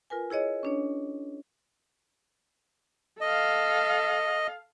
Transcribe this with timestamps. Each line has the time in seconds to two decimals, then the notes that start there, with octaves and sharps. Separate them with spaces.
0.10 F4 A#4 B4 G#5
0.30 E4 G#4 C#5 D#5
0.63 C#4 D4 C#5
3.21 A4 D#5 F5